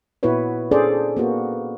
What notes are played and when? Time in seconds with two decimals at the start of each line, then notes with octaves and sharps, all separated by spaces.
0.23 A#2 B3 E4 F#4 B4 C#5
0.71 C#4 D4 G#4 A4 C5 D5
1.17 A#3 B3 F#4